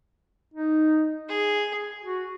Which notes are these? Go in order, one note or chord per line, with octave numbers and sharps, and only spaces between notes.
D#4
G#4
F#4